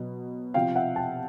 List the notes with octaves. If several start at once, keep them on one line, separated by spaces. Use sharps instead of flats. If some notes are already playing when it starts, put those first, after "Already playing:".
Already playing: B2 F#3
C3 F3 F5 G5
E5 F#5
G5 A5